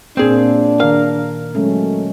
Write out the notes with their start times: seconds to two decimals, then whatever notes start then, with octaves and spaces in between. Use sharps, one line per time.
0.17 A#2 A#3 C4 D4 G#4
0.80 D#3 A#4 F5
1.55 F#3 G#3 A3 C#4